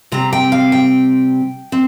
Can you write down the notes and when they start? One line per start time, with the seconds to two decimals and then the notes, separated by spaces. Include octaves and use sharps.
0.12 C3 G3 C4 A#5
0.33 G5
0.52 F5
0.72 G5
1.72 C4